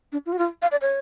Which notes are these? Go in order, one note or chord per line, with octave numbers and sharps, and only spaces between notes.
D4
F4
F#4
F4
F5
D5
C#5